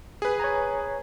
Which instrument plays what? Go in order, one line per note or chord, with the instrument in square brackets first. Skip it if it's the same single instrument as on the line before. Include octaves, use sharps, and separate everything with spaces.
[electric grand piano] G#4 B4
[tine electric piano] C#5 G#5 A#5